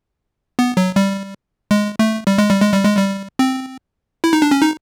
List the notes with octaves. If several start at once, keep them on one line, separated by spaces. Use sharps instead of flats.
B3
F#3
G3
G#3
A3
G3
G#3
G3
G#3
G3
G#3
G3
C4
E4
D#4
D4
C#4
D#4